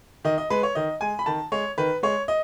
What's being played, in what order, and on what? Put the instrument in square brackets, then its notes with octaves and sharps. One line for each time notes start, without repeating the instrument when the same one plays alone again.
[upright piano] D#3 D#5
D#5
G#3 B4
C#5
D#3 D#5
G#3 G#5
B5
D#3 A5
G#3 C#5
D#3 B4
G#3 C#5
D#5